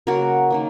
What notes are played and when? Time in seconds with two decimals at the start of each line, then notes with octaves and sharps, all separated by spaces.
0.07 C#3 F#3 A#3 F#4 A#4
0.50 D#3 F#3 A#3